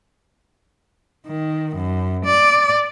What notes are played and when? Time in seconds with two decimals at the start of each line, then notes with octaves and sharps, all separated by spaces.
1.27 D#3
1.75 F#2
2.25 D5